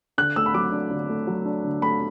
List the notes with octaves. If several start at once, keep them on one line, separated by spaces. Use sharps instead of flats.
D3 F#6
A3 E6
B5
F#3 D6
D4
D3
A3
F#3
D4
D3
A3 B5